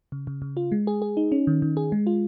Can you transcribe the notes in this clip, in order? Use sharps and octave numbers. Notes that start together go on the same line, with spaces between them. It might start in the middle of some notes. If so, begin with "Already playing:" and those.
C#3
C#3
C#3
F4
G#3
G#4
G#4
D#4
C#4
D#3
D#3
G#4
G#3
F4